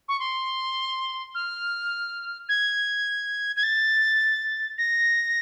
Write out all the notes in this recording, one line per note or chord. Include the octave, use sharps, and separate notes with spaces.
C#6
C6
F6
G#6
G#6
A6
A#6